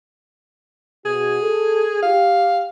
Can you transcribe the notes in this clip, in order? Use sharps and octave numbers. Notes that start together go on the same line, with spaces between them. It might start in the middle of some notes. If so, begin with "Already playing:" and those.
B2 F#4 G#4
A4
G4 F5